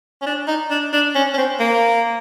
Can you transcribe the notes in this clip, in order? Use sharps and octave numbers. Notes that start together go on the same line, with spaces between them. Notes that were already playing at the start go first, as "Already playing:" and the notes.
C#4
D4
D#4
D4
D4
C#4
C#4
C4
A#3